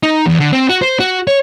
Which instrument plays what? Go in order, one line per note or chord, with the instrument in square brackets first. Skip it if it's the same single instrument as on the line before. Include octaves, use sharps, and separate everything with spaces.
[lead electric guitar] D#4
E2
D3
C4
F#4
C5
F#4
C#5